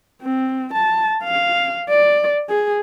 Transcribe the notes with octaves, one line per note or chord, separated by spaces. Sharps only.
C4
A5
F5
D5
G#4